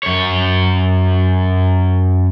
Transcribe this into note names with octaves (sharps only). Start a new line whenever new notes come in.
F#2 C#5